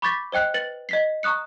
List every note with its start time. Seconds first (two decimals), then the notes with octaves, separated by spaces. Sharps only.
0.02 B5 C#6 D6 G6 A6 B6
0.32 C5 D#5 G5 F#6 C7
0.54 B4 A6 C#7 F#7
0.89 D#5 B6 C7
1.23 A#5 C#6 D#6 F#6 C#7